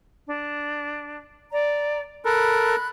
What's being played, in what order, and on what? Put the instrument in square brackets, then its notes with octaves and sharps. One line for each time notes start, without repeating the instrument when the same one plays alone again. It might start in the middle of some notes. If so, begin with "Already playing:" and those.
[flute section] D4
D5 A#5
[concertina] A4 A#4 [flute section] B5 F#6